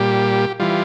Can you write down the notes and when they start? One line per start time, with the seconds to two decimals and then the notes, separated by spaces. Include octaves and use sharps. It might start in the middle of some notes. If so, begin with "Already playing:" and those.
Already playing: A#2 G3 G4
0.60 E3 G3 F4